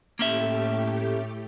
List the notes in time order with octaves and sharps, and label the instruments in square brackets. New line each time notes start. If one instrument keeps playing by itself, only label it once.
[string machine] A2 A3 G4 [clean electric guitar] A#3 C#4 E5